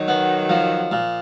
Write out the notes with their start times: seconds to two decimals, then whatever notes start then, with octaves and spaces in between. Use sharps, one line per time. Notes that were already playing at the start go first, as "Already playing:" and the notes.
Already playing: D#3 F#3 D#4
0.08 B3
0.50 F3
0.92 A#2